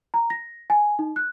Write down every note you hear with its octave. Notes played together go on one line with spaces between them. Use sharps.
A#5
A#6
G#5
D#4
F#6